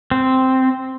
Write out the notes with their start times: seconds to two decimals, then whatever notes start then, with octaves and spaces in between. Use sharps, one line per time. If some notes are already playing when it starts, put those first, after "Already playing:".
0.11 C4